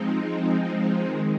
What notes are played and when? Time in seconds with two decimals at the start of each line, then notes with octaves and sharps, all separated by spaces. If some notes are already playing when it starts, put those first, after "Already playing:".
Already playing: F3 G#3 C4 D#4
1.06 D#3 G#3